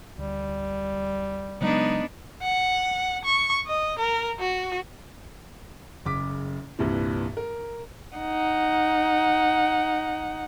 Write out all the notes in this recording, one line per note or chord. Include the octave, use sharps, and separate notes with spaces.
D2 G3
C#3 F#3 G#3 B3 D4 D#4
F#5
C#6
D#5
A#4
F#4
F#1 C#3 D6 B6
C2 G2 A#2 E3
A#4
D#4 F#5